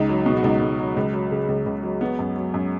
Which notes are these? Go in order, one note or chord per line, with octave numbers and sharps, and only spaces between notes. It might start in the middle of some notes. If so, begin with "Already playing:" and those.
Already playing: C#2 D#4
F#3
B2
F#4
C#2 D#4
C#2
F#3
C#2
F#3
C#3
C#2
C#2
F#3
F#3 B3
F#2
F#3
F#2